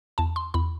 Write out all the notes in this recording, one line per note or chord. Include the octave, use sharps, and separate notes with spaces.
E2 A5
C6
E2 B5